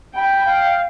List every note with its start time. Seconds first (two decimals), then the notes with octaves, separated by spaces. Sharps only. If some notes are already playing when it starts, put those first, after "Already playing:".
0.16 G5 B5
0.46 F5